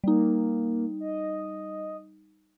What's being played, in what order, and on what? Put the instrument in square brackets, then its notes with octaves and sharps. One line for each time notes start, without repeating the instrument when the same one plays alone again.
[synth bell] G3 D#4 [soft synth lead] A#3
[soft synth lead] D#5